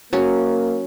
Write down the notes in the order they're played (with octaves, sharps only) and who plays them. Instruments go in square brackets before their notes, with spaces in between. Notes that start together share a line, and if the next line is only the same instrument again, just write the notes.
[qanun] F#3 C#4 [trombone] A#3